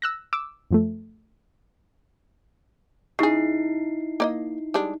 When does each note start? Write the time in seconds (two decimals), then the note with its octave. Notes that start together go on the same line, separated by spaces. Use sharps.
0.02 E6 F#6 A#6
0.33 D6 E6
0.71 F#2 F3 A3
3.19 C#3 D#4 E4 G#4 C7
4.20 A#3 D5 D#5
4.74 G3 G#3 D4